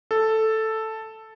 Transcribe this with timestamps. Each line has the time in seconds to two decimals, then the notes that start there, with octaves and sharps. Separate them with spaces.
0.11 A4